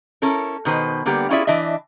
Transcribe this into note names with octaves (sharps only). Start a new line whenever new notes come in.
C#4 E4 A4 A#4
B2 D#3 B4 C5
D3 G3 A#3 B3 G4
C#4 E4 F4 G#4 D5 E5
E3 D4 D#5 E5